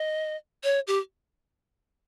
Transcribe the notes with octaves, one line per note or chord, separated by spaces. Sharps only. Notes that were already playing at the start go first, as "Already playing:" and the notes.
Already playing: D#5
C#5
G4